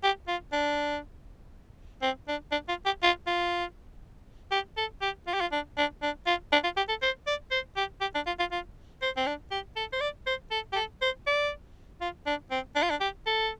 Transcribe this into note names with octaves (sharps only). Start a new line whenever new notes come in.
G4
F4
D4
C4
D4
D4
F4
G4
F4
F4
G4
A4
G4
F4
G4
F4
D4
D4
D4
F4
D4
F4
G4
A4
C5
D5
C5
G4
G4
D4
F4
F4
F4
C5
C4
D4
G4
A4
C5
D5
C5
A4
G4
A4
C5
D5
F4
D4
C4
D4
F4
D4
G4
A4